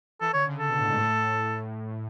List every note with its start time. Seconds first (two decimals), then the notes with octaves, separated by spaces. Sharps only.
0.21 E3 A4
0.34 D3 C#5
0.46 C#3
0.59 C#3 A4
0.68 B2
0.78 A2
0.87 G#2
0.97 A2